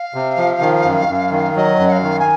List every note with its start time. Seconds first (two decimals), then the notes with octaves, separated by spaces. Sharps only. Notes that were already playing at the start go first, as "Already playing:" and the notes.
Already playing: F5
0.14 C3
0.38 F3
0.61 D#3
0.85 F#2
1.08 F#2
1.31 D#3
1.56 F#3 D#5
1.79 F#2
1.87 F#5
1.92 F5
2.03 D#3
2.19 G#5